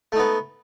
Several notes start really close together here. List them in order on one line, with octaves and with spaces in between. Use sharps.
A3 D#4 B3